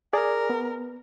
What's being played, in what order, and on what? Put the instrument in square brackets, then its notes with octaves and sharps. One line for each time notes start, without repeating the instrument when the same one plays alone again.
[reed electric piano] G#4 D5 [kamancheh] A#4
[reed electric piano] B3